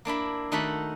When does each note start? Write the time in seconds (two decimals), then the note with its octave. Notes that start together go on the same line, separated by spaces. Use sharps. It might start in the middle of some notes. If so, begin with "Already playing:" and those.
0.05 A#3 D4 E4 B5
0.52 D#3 A3 D#4 F#4 A4 B5